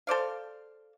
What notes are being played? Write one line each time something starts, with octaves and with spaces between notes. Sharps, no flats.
A4 C5 D5 F5